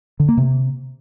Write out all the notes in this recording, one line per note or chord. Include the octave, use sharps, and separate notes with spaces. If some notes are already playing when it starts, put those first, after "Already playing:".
D3
A#3
C3